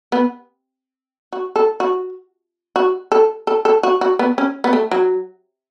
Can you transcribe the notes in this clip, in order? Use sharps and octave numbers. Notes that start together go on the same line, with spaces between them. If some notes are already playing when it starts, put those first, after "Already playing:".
B3
F#4
A4
F#4
F#4
A4
A4
A4
F#4
F#4
B3
C#4
B3
A3
F#3